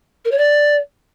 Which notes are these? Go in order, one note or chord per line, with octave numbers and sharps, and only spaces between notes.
A#4
C#5
D5